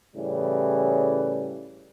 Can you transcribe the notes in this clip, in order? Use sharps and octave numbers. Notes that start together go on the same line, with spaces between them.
A2 C#3 E3 G3